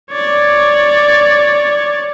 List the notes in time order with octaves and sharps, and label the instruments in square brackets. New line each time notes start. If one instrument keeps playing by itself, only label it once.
[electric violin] C#5 D5